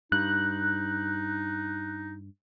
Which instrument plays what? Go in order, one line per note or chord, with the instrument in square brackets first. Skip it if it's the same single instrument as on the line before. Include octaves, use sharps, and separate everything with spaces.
[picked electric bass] G2 [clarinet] D#4 [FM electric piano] F#6